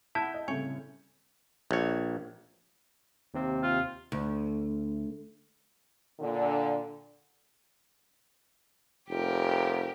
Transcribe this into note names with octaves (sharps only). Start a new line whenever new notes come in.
E4 F#5 A5 B5 G6
D#5
C2 A2 C#3 C#5 G#5 C#6
A#1 C#5
D#2 C3 C4
F4
D2
A#2 D3
F1 G4 A#4